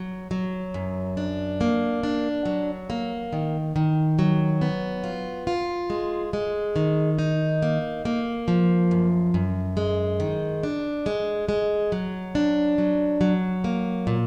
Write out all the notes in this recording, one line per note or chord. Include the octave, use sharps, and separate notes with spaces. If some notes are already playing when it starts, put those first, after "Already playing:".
Already playing: F#3
F#3
F#2
D4
A#3
D4
F#3
A#3
D#3
D#3
F#3
B3
F4
F4
G#3
G#3
D#3
D#4
A#3
A#3
F3
F#2
F#2
G#3
D#3
D4
G#3
G#3
F#3
D4
F#3
F#3
A#3
A#2